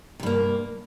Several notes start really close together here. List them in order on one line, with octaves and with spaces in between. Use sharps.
C3 G2 A#3